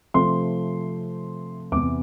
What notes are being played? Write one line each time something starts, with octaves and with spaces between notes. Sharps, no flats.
C3 F3 A3 C4 C6
E2 C3 E3 D6